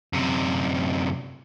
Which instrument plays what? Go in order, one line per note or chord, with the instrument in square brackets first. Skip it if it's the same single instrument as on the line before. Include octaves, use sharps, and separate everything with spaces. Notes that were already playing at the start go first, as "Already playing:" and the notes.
[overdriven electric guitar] F#2 C3